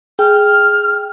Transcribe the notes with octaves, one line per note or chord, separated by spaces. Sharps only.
G#4 G5 F6